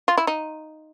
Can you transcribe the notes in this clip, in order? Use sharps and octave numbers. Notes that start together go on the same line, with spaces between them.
F4
E4
D#4